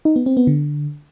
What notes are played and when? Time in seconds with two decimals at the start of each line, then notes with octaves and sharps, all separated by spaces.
0.05 D#4
0.16 B3
0.26 C4
0.37 B3
0.47 D3